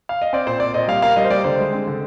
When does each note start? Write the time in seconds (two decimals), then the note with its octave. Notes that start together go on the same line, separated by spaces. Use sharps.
0.09 F5
0.22 D#5
0.33 C4 D5
0.47 A#2 C5
0.60 C4 D5
0.74 A#2 D#5
0.88 G3 F5
1.02 A#3 F5
1.16 G3 D#5
1.24 C5
1.30 G3 D5
1.44 D3 C5
1.58 G#3
1.73 C4
1.87 D3